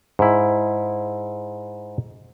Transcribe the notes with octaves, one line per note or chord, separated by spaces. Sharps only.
G#2 E4